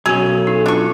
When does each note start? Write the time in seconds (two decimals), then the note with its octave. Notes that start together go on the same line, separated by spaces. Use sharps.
0.06 B1 C#4 F#4 G#4
0.22 A4
0.47 D#4
0.66 D4 F4 C#6